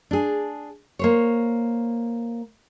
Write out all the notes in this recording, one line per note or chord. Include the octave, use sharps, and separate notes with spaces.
D4 G#4
A#3 C5 C#5